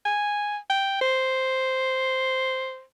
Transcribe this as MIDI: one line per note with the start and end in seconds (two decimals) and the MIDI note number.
0.05 0.57 80
0.70 1.00 79
1.01 2.83 72